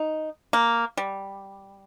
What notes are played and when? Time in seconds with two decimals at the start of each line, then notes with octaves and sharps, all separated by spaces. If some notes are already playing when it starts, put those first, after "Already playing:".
Already playing: D#4
0.53 A#3
0.97 G3